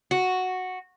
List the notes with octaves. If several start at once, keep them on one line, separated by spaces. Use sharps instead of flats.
F#4